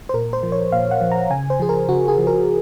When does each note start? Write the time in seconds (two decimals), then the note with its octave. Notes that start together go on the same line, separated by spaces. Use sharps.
0.09 C5
0.14 A#2 A#4
0.33 C5
0.43 F3
0.52 C#5
0.72 A#2 F5
0.91 F#5
1.01 F3
1.12 A#5
1.30 C#3 G#5
1.50 C5
1.60 F3 G#4
1.69 A#4
1.88 C#3 F#4
2.08 G#4
2.18 F3
2.27 A#4